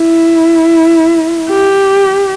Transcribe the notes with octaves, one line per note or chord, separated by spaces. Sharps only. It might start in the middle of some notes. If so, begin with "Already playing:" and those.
Already playing: E4
G4